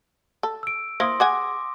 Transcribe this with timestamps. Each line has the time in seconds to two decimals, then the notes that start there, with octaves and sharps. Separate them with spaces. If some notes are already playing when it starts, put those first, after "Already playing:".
0.43 A4
0.63 E6 D7
1.00 A#3 E4 C5 C6 D#6 A#6
1.20 G#4 F#5 G#5 D6